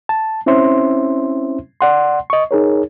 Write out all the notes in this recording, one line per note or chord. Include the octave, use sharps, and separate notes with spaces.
A5
C4 C#4 E4 C5 E5 C6
D5 F#5 C6
D#5 C#6
D#4 G#4 A#4 C#5